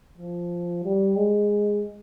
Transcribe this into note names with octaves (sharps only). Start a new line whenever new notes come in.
F3
G3
G#3